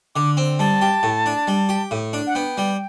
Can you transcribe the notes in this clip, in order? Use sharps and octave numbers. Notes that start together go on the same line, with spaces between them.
D3 D6
C4
G3 A5
G4
A2
D4
G3
G4
A2
D4
F#5
B3 G5
G3